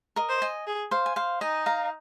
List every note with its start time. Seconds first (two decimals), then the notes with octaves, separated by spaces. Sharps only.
0.16 A#4 D#5
0.29 C5
0.42 D#5 G#5
0.67 G#4
0.91 C5 F5
1.06 G#5
1.16 C5 F5
1.41 D#4 D#5 G#5
1.66 F5 A#5